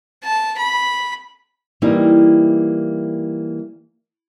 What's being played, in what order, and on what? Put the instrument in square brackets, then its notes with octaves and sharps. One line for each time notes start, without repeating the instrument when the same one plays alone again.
[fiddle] A5
B5
[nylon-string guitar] E3 G3 A#3 C4 D#4 E4